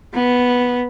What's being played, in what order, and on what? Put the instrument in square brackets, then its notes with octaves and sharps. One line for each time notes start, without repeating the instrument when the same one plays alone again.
[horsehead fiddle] B3